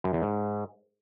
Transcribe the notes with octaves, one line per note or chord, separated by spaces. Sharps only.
F#2
E2
G#2